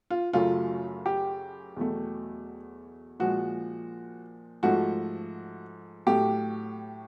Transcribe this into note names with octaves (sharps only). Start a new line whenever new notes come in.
F4
F#2 C#3 F#3 A3 F4
G4
E2 B2 F#3 A3
A#2 F3 G#3 F#4
G#2 F3 A3 F#4
A2 F#3 A3 G4